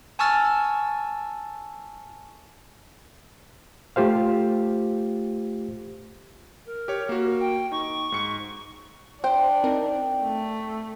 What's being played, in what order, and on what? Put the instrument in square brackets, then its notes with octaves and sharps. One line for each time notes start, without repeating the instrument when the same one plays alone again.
[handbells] G#5 A5 C#6 E6 F6 A6
[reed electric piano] A3 F4 G4 C5 F5
[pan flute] A#4
[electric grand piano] G4 C#5
A#3 F#4
[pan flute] G5
[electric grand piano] D#4 [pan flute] C#6
[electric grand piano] G#2 C#7
[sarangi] D4 [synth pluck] C5 [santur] G5
[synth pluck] C4 D#4 A#4
[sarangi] A3